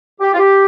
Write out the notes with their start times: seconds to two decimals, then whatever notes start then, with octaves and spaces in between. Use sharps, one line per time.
0.21 G4
0.33 F4
0.38 G4